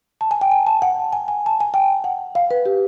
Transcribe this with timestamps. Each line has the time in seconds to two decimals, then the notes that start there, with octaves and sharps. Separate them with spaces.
0.21 A5
0.31 G#5
0.41 G5
0.51 G#5
0.67 A5
0.82 F#5
1.12 G#5
1.28 G#5
1.46 A5
1.60 G#5
1.74 G5
2.04 F#5
2.35 F5
2.51 B4
2.66 G4